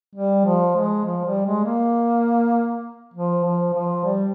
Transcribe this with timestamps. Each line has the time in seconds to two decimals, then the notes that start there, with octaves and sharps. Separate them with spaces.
0.15 G3
0.45 F3
0.76 G#3
1.05 F3
1.25 G3
1.45 G#3
1.65 A#3
3.14 F3
3.44 F3
3.74 F3
4.04 G3